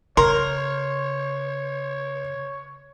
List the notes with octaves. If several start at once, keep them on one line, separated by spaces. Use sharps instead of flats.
C#3 A#4 C#5 C6